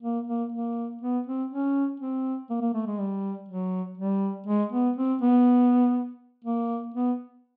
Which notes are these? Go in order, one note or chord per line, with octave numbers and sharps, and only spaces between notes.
A#3
A#3
A#3
B3
C4
C#4
C4
A#3
A#3
A3
G#3
G3
F#3
G3
G#3
B3
C4
B3
A#3
B3